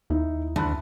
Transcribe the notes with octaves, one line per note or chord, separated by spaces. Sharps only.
D#2 D#4 E4
D2 A5 B5 F#6